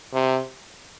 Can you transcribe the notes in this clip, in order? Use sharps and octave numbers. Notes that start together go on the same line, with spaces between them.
C3